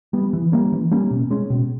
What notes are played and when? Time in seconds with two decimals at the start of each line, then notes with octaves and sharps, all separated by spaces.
0.13 G3 B3
0.33 E3
0.52 G3 A#3 C#4
0.72 E3
0.91 G3 A#3 C#4
1.11 B2
1.31 G#3 C#4
1.50 B2